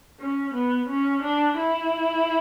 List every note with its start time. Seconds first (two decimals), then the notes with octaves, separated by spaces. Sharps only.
0.20 C#4
0.54 B3
0.89 C#4
1.23 D4
1.57 E4